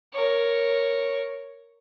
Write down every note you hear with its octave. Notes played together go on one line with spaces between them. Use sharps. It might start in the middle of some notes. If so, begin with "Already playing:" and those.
A#4 C#5